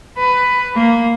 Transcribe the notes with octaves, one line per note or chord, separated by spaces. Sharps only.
B4
A#3